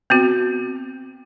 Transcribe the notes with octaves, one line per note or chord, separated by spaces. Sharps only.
B3 C4 F#4